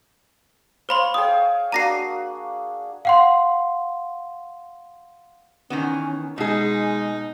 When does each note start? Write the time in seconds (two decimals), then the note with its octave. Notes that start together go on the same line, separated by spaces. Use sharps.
0.89 C5 C#5 F5 B5 C6
1.14 G#4 C#5 G5 D#6
1.72 A#3 D4 F#4 A#5 A#6 C7
3.05 F5 F#5 C6
5.70 D#3 E3 B3 C#4
6.38 B2 G#3 D#4 G#4